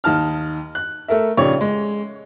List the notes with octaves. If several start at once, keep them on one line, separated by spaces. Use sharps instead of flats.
D#2 D#4 A5 F6
F#6
A3 A4 A#4 E5
A#1 C#3 D#4 G4 C#5 D5
G#3